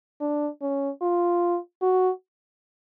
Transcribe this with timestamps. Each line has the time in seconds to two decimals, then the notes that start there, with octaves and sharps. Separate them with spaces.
0.21 D4
0.61 C#4
1.02 F4
1.82 F#4